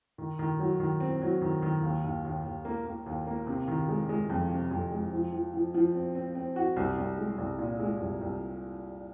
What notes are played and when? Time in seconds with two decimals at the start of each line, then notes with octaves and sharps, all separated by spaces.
0.18 D#3
0.39 D#3
0.60 F#3
0.80 D#3
1.00 C4
1.22 F#3
1.42 D#3
1.62 D#3
1.83 D#2
2.04 D#2
2.24 D#2
2.44 D#2
2.65 A#3
2.86 A#3
3.06 D#2
3.27 A#3
3.47 C3
3.68 D#3
3.89 G#3
4.09 G#3
4.30 F2
4.50 C3
4.71 F2
4.91 G#3
5.12 F3
5.32 F3
5.54 F3
5.74 F3
5.95 C4
6.15 C4
6.35 C4
6.56 F#4
6.76 C2
6.97 C2
7.18 G#3
7.38 C2
7.59 A#2
7.80 G#3
8.00 C2
8.21 C2